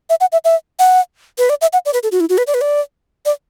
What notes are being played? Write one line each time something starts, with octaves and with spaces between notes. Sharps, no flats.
E5
F#5
E5
E5
F#5
B4
D5
E5
F#5
D5
B4
A4
F#4
E4
F#4
B4
D5
B4
D5
D5